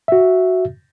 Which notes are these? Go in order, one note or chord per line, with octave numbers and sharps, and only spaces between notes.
F#4 E5